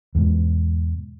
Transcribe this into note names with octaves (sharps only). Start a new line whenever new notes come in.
E2 G#2 B2